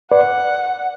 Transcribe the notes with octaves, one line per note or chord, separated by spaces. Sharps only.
B4 D5 F#5